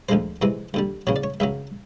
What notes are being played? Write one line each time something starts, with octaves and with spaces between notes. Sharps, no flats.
D2 D3 F3 G#3 C5
F2 C3 E3 G#3
D#2 D3 G3
E2 C#3 F#3 C#5
D5
C#5
C#2 C#3 F#3 E5